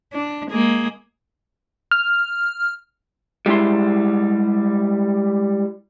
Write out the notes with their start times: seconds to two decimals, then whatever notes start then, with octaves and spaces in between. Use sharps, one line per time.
0.13 D4
0.51 G#3 A#3 G#4
1.91 F6
3.46 G3 G#3 E4 C6